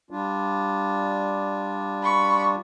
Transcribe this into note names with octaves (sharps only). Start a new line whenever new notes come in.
G3 D4 F4
B5 C#6